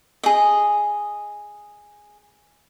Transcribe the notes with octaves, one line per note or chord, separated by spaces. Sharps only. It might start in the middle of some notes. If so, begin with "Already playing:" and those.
G#4 D#5